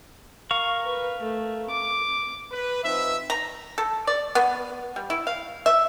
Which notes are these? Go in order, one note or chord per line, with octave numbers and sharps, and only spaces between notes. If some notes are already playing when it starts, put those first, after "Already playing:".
A#4 F5 C#6
B4
A3
D6
B4
F3 C4 D#4 B4 E5
A#5
A4
D5
B3
G3
E4
F5
E5